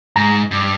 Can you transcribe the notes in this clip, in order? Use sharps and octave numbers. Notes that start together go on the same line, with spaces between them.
G#2 A#5
G2